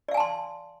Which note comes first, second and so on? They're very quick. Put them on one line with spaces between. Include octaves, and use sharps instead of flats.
D5 F5 G#5 A5 C6